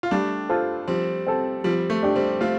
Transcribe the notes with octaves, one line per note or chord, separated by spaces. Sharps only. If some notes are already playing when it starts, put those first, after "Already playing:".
F4
G3 A3 D4
F4 A4 C5
F3 G3 C4
C4 A4
F3 G3 C4
A3
D4 G4
G3 C4
A3 C4 F4